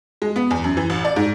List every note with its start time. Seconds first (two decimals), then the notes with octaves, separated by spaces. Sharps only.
0.22 G#3
0.36 B3
0.51 E2
0.64 F#2
0.77 E3
0.90 A1
1.05 D5
1.16 G#2